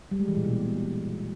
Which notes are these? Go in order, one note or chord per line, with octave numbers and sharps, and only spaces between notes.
G3
G#3
E3
A#2
B2